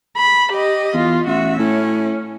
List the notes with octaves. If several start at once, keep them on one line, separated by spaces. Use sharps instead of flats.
B5
G4 D#5
E2 F4
A1 F#4 E5
A2 C#4